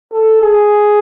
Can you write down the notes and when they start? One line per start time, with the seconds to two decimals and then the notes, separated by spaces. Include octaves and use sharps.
0.12 A4
0.41 G#4